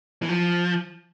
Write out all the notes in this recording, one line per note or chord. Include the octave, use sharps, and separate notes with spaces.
E3
F3